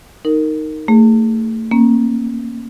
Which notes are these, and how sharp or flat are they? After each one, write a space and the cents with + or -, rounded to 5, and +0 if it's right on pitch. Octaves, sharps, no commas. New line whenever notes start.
D#4 +0 A#4 -15
A3 +30 G#4 +0
A#3 +0 C#4 -30